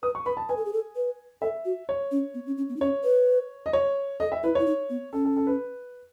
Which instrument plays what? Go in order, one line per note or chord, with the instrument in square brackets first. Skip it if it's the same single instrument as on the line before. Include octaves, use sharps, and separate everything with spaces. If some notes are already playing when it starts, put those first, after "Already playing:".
[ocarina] B4 [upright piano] D#6
[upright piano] C#6
[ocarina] B4 [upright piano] B5
[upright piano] A5
[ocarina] B4 [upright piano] G#5
[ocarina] A4
G#4
A4
B4
[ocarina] A4 [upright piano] E5
[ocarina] F#4
[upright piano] C#5
[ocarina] C#4
B3
C#4
C#4
B3
D#4
[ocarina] C#4 [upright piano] C#5
[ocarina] B4
[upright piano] D#5
C#5
[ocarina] A4 [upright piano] D#5
[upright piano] E5
[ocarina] E4 [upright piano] B4
[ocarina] E4 [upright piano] C#5
[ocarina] D#4
B3
[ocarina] C#4 [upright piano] A4
[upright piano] A4
A4
B4